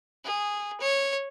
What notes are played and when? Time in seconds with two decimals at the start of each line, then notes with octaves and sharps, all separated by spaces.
0.25 G#4
0.80 C#5